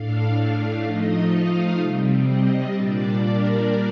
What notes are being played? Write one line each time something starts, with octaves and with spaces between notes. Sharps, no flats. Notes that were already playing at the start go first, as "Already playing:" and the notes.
Already playing: A2 A3 D4 F5
F3 A3 D#4 D#5
F5
C3 G3 C4
D#5
A#2 G3 D4 D5
A#4